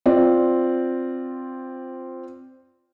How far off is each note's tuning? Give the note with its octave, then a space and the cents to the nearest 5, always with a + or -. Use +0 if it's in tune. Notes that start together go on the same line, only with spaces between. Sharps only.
C4 +0 F4 +0 D5 +0